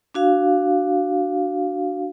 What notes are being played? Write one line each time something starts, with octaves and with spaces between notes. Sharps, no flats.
D4 F#4 F5